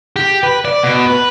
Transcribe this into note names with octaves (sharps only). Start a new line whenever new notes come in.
G4
B4
D5
B2
B4